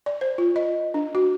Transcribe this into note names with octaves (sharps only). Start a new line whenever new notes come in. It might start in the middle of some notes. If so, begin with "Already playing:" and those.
D5
C5
F4
D#5
D4
F#4